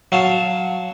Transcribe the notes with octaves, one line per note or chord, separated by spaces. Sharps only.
F#3 F5 A5